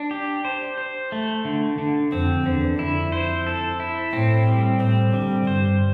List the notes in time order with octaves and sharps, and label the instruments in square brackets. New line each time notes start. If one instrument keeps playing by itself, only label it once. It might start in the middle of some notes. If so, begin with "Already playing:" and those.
Already playing: [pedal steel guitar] D4
G4
C5
C5
A3
D3
D3
[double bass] F2 [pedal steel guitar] C4
[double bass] E2 [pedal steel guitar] D3
[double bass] F2 [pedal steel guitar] E4
[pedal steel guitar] C5
A4
E4
[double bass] A2 [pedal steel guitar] C4
[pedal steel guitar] G3
[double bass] A2 [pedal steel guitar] C4
[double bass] D3 [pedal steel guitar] G3
[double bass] G2 [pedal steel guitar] C5